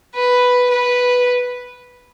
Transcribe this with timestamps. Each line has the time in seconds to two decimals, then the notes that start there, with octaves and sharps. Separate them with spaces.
0.15 B4
0.71 B4